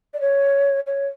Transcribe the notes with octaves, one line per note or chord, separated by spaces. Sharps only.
D5
C#5
C#5